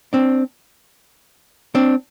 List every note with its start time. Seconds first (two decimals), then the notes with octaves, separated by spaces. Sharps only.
0.13 C4 D4
1.75 C4 D4